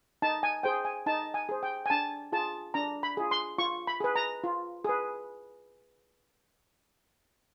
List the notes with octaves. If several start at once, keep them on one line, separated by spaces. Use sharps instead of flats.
D#4 A5
G#5
G#4 C5 G5
G#5
D#4 A5
G#5
G#4 C5
G5
G#5
D4 A5
F4 G#4 A5
D4 A#5
B5
F4 G#4
C6
F4 C#6
B5
G#4 B4
A#5
F4
G#4 B4